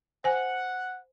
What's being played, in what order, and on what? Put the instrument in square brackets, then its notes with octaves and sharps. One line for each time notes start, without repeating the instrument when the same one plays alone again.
[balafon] C5 G#5 [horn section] F#5